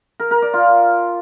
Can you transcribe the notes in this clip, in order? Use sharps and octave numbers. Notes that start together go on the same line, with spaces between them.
A#4
A#4
D5
F4